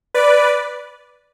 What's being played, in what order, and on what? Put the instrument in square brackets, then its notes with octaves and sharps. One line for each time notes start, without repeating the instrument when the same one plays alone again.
[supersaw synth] B4 D5